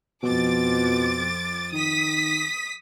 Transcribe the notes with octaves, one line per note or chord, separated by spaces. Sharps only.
F2 B2 D6 A6
D#3 D#6 B6